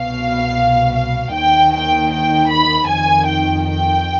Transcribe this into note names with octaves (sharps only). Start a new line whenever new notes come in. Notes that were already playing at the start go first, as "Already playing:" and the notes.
Already playing: C2 B2 F5
F5
D#2 D#3 G5
G5
G5
B5
F2 D#3 G#5
G5
G5